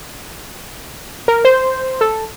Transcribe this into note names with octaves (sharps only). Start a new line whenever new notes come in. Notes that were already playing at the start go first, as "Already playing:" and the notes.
A#4
C5
A4